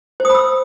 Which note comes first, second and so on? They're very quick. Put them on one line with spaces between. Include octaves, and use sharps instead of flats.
C5 D#6 B5 E6